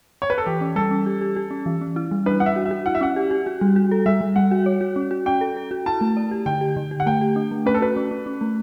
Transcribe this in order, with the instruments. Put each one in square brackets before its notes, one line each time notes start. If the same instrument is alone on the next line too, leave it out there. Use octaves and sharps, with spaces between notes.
[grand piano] C#5
B4
A4
[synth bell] E3 [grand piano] G4
[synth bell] C#4
[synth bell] G3 [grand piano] A4
[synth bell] C#4
G4
G4
G4
C#4
E3
C#4
E4
G3
[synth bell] D4 [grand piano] B4
[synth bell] D4 [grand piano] F#5
[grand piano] E5
[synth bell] F#4
[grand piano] E5
[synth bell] F#4
[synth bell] E4 [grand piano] F#5
[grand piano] E5
[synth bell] C#4 [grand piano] F#5
[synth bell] G4
G4
F#4
G3
F#4
A4
[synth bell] G3 [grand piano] E5
[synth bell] G3
[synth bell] G3 [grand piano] F#5
[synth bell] F#4
C#5
F#4
C#4
F#4
[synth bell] C#4 [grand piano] G5
[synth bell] A4
A4
F#4
[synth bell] E4 [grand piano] A5
[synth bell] A3
D5
G4
[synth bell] D3 [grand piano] G5
[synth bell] G4
D3
G4
[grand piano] F#5
[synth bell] A3 [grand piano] G5
[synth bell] G4
D4
A3
[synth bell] C#4 [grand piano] B4
[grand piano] A4
[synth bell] F#4 [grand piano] B4
[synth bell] C#4
C#4
C#4
A3